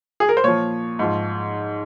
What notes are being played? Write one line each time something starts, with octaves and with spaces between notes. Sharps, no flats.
G#4
A#4
C5
A#2 F3 C#5
G#2 F3